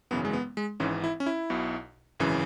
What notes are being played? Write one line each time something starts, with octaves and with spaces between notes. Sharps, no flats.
G#1 F#2 C#3 E3 B3
G#3
B3
G#3
G#1 G#2 E3 C#4
E4
C#4
E4
B1 B2
G#1 F#2 C#3 E3